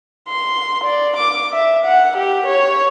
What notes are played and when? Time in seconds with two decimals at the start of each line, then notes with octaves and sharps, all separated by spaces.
0.28 C6
0.84 D5
1.17 D6
1.52 E5
1.85 F#5
2.17 G4
2.46 C#5